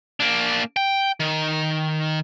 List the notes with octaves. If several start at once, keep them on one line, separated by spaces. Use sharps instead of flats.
A#3 D4
G5
D#3